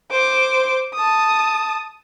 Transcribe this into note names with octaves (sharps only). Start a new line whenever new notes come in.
C5 D6
A5 D#6